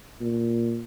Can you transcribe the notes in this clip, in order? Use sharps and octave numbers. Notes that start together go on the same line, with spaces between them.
A#2